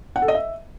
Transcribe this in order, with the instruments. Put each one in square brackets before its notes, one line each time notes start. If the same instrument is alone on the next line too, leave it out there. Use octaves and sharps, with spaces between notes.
[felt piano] F#5
A4
D#5
E5